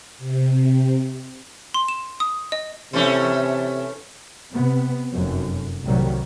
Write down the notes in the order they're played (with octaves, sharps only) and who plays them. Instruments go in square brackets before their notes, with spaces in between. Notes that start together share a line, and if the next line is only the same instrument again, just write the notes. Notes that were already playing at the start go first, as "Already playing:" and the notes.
[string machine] C3
[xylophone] C6
E7
D#6
D#5
[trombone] C3 [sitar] E3 A3 C#4
[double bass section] C3 B3
F1 F#2
C2 A2 D#3 F#3 G3